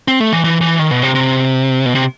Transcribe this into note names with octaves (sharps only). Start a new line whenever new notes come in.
C4
A3
E3
E3
E3
D#3
B2
C3
C3
B2
C3